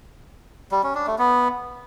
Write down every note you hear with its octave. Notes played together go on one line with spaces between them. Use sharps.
G3
C#4
D4
A3
B3